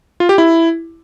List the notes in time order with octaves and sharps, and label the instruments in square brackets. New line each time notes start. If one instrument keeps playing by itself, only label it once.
[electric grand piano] F4
G4
E4